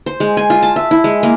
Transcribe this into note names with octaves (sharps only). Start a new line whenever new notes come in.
C5
G#3
G#5
F4
A5
E5
E4
G#3
A#3